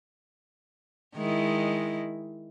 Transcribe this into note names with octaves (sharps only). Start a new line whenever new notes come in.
D#3 G#3 E4